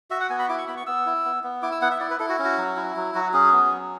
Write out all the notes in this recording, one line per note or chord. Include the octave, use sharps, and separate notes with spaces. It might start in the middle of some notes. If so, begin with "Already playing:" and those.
F#4 E5
F#5
B3 G#5
B5
E4 D6
C#6
B3 B5
C#6
B3 E6
E4
B3
B3
E4 D6
E6
B3 F#5
E5
E4 D5
B4
E4 A4
F#4
C#4
F#4
F#3
E4
F#3
F#3 F#4
C#4 G#4
B3
F#3